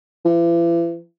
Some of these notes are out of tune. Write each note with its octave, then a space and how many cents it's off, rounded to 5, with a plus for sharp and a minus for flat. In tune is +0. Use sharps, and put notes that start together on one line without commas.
E3 +40